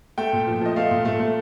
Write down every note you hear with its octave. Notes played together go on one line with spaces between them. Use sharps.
A3 G5
A#2
F3
F3 D#5
A3 F5
A#2
A3
A3